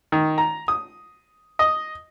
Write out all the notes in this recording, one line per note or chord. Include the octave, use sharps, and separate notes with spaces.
D#3
A#5
D#6
D#5